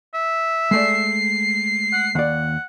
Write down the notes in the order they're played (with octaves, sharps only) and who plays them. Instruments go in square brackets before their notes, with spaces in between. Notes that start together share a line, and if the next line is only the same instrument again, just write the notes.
[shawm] E5
[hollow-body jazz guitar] G#3 A3 D5 [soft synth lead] C7
[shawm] F#5
[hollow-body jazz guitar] D#2 D5 [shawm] F#5